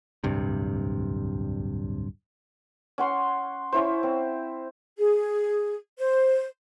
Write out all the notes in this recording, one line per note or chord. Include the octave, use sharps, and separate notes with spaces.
D1 C2 G2 C3
C#4 F#5 C6
C#4 E4 C5
C4
G#4
C5